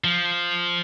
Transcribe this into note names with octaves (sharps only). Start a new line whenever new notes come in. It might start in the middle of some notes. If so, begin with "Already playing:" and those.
F3